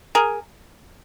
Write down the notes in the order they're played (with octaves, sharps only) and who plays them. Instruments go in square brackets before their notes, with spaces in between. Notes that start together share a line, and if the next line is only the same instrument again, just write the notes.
[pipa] G#4 A#4